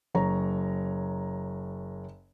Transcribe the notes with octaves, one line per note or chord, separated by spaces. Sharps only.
F#1 C#5 A#5